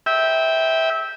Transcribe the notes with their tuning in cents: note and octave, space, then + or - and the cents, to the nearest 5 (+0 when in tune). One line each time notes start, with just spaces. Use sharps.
E5 -20 G5 +0